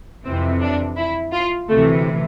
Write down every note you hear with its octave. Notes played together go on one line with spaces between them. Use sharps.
F2 C3 E3 C4
D4
E4
F4
D2 C3 E3 A3